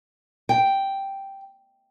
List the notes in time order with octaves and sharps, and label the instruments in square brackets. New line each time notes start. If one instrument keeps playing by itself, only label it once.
[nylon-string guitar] G5